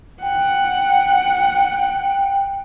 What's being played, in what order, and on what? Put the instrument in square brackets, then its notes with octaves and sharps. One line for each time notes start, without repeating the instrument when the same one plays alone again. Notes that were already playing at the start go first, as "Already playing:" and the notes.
[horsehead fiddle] F#5 [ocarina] G5